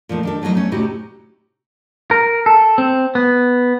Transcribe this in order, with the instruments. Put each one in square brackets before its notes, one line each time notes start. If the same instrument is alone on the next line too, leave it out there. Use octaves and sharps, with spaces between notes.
[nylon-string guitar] A#2 F3 A3 D#4
D#3 D4 A4
F3 F#3 A3 A#3 D#4
A3 B3 C#4
A2 C3 D#4 F#4 G4
[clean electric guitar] A#4
A4
C4
B3